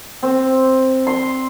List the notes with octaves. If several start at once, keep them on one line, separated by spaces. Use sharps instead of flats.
C4
C6